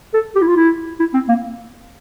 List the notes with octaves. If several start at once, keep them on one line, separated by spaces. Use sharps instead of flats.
A4
G4
E4
F4
E4
E4
C4
A#3